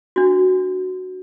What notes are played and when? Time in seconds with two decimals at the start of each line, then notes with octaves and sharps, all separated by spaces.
0.16 D4 F#4